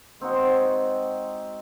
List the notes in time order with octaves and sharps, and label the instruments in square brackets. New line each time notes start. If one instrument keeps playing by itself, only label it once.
[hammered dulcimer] G#3 C4 D#4 F#4